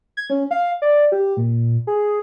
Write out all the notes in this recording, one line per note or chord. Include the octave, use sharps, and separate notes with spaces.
G#6
C#4
F5
D5
G4
A#2
G#4